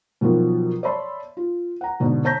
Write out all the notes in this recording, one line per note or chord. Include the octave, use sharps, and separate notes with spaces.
B2 D#3 F3 F#3
C#5 D5 E5 A5 B5 C6
F4
F#5 A#5
G#2 B2 D3
C#5 A5 A#5 G6 A#6 B6